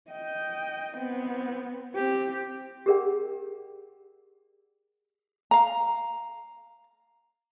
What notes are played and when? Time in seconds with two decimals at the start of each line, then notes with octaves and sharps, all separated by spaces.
0.11 D#5 G5
0.97 B3 C4
1.95 C4 G4
2.86 G4 G#4 A#4 D5 F#5 G5
5.51 F5 A#5